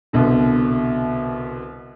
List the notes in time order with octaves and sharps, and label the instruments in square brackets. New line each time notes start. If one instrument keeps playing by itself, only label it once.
[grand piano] C2 B2 D3